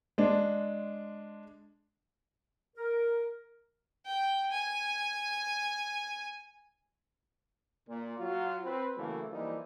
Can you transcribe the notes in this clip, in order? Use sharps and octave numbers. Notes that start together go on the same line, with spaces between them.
G#3 D4
A#4
G5
G#5
A#2
F#3 F4 F#4
C4 B4
C#3 E3 F#3 A3 A#3
E3 F3 G3 A#3 D#4 E4